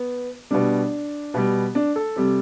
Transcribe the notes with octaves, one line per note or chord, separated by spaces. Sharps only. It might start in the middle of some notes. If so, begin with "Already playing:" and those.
Already playing: B3
B2 G3 D4
B2 G3
D4
A4
C3 G3